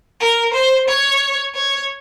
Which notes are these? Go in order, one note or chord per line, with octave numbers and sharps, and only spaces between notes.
A#4
C5
C#5
C#5